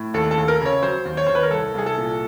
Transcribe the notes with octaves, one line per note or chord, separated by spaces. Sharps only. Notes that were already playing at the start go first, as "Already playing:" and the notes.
Already playing: A2
D#2 A4
A4
D#2
A#4
C#3 C#5
F#3 C5
D#2
C#5
D#2 C5
B4
A#4
C2 A4
C2 G#4
A4
A#2